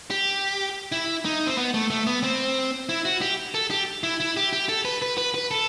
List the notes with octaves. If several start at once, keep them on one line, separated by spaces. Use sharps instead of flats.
G4
E4
D#4
C4
B3
A3
A3
B3
C4
E4
F#4
G4
A4
G4
E4
E4
G4
G4
A4
B4
B4
B4
B4
A4